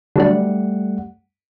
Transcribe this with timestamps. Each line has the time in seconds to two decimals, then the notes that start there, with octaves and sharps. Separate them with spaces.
0.16 D3 F#3 G3 A3 D4 F#5